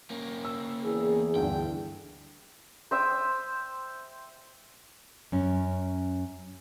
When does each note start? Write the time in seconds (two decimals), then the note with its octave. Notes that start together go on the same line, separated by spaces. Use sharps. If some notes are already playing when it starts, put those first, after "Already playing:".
0.11 A#3 C#4
0.45 E6
0.84 E2 G#4
1.36 D2 G2 D3 G5
2.91 C5 E5 G5 D#6
5.32 F#2 C#4